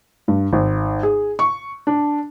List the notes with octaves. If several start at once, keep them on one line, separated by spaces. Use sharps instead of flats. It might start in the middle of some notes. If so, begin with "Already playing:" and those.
G2
G#1
G#4
C#6
D4